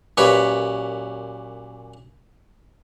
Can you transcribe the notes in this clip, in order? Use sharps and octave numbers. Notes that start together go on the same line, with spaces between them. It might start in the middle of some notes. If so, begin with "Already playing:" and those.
F#2 A#2 G4 B4 C#5 B5